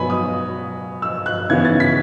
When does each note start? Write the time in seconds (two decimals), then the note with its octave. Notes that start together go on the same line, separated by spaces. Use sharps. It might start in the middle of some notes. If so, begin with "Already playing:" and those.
Already playing: B2 F#3 B3 G#5 B5
0.10 D#6
1.02 E6
1.26 F#6
1.49 C#3 E3 B3 E4 G#6
1.65 A6
1.80 B6